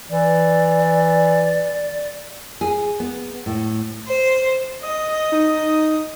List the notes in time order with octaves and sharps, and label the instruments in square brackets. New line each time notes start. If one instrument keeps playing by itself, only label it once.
[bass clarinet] E3 [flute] D5
[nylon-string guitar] G#4
B3
A2
[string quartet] C5
[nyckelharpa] D#5 [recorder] D#6
[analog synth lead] D#4